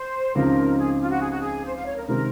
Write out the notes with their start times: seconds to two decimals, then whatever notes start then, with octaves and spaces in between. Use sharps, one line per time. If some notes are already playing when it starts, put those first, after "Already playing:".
Already playing: C5
0.35 C#2 C#3 F3 C4 D#4 A#4
0.78 G#4
1.00 F4
1.10 F#4
1.21 G#4
1.31 F#4
1.41 G#4
1.65 C5
1.75 F5
1.86 C#5
1.96 A#4
2.08 C3 D#3 G#3 C4 A#4